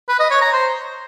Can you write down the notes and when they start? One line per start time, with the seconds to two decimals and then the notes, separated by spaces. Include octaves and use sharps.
0.08 B4
0.20 D#5
0.31 C#5
0.42 A#5
0.53 C5